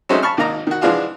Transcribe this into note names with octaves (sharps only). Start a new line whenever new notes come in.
F#3 G#3 A3 C4 C#4 D#4
A5 B5 C#6 F6
G#1 D#3 A#3 D#4 A#5
D#3 F#4
E3 F3 G#3 D4 F4 F#4